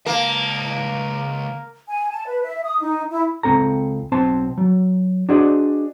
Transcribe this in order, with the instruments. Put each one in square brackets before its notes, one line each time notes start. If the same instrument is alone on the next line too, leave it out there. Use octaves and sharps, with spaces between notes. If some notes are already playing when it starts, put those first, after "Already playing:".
[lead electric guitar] C#2 A5 [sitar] A#3
[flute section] G#5
A5
B4
E5
D#6
D#4
E4
[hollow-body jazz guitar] C#2 A#2 C4 A4 A#5
B1 C4 C5 A5
F#3
D4 F#4 G#4 C5 D5 D#5